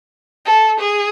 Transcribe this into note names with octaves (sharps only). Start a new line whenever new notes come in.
A4
G#4